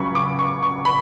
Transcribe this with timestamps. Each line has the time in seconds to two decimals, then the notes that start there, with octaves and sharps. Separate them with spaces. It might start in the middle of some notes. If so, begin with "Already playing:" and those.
Already playing: C#2 C#3 F#3 B5 C#6
0.15 D6
0.39 C#6
0.63 C#6
0.85 B5